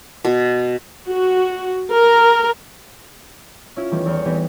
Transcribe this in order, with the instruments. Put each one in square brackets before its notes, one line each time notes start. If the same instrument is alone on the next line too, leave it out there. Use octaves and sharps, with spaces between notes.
[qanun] B2
[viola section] F#4
A#4
[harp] C#4 E4 F4 E5
D#3 E3 G3 A3 B3
E2 B3 C#6 F6
E3 B3 C4 D#4 G4 B4